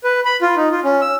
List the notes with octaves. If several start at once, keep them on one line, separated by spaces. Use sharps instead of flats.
B4
B5
F4
D#4
F4
C#4
E6